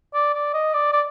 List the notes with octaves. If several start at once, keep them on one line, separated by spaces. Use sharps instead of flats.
D5
D5
D#5
D5
D5